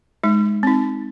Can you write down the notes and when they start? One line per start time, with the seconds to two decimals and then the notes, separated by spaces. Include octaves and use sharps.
0.24 G#3 D#4
0.63 C4 D#4